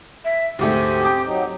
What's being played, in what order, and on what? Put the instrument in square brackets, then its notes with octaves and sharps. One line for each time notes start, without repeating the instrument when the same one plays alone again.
[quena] E5
[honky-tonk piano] D2 G#2 A3 [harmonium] C4 [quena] G4
[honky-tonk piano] G5 D6 D#6
[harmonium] F#3 D#4